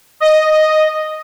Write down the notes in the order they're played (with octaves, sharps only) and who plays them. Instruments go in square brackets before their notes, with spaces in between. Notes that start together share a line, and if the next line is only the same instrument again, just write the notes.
[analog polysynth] D#5